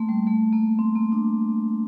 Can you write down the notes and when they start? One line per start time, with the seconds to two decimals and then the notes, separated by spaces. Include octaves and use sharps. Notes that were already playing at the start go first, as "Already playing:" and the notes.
Already playing: A3 A#3 C4
0.09 G3
0.27 A3
0.53 A#3
0.79 C4
0.95 A#3
1.12 D4